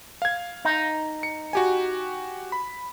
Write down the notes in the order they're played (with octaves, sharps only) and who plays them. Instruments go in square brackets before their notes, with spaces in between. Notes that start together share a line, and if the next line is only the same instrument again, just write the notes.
[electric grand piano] F5 G#6
[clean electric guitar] D#4
[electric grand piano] C#7
F#4 G4 G#5
B5